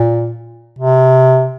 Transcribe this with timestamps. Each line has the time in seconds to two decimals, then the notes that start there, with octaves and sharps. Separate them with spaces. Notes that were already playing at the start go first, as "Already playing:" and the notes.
Already playing: A#2
0.79 C3